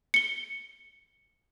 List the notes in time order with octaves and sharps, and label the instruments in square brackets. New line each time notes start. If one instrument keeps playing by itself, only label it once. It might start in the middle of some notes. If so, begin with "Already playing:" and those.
[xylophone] C#7 G7